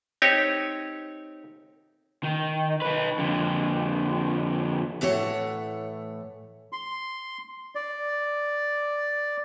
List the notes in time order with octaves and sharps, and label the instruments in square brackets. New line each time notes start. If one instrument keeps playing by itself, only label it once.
[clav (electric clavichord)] C4 D#4 G4 C#5
[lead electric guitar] D#3
D#4 B4
F2 D3
[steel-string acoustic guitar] A2 E3 A3 C#5 F#5
[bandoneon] C6
D5